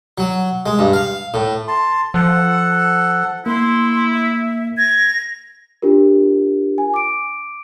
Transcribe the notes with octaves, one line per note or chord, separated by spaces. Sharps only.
F#3
G#3
G2
F5
A2
A5 C6
F3 A4 F#5
A#3 E4 C6
E5
G#6 A#6
D4 F4 G4 A#4
G#5
D6 D7